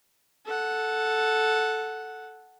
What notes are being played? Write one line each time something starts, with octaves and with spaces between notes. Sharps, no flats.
A4 F#5